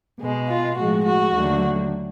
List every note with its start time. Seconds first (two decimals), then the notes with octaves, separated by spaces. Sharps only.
0.19 B2 G#3
0.48 F4
0.76 A2 F3 G#3 F#4
1.05 F#4
1.33 D#2 D3 F#3 A3